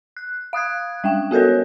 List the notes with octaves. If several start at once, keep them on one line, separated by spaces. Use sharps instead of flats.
F#6
F5 D#6 F#6 G#6
G3 G#3 G5
B3 F#4 A4 A#4 C#5